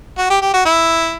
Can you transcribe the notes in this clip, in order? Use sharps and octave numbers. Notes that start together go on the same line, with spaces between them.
F#4
G4
G4
F#4
E4